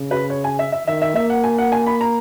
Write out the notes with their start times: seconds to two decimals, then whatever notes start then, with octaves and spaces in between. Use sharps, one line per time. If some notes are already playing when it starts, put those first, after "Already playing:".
Already playing: C#3
0.11 B4
0.30 C#5
0.44 G#5
0.59 E5
0.72 E5
0.86 D#3 E5
1.02 E5
1.15 A#3 E5
1.30 F#5
1.44 G#5
1.58 F#5
1.72 G#5
1.86 B5
2.01 A#5